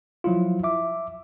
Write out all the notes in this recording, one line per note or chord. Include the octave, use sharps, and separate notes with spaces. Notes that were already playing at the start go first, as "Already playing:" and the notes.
F3 F#3 E4 F4
E5 D6